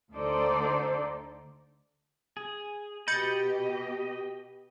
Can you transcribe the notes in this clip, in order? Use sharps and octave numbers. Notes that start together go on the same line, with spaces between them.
D2 D3 D#4 A4 C5 D5
G#4
B2 G4 D#5 B5 G6 A6 C#7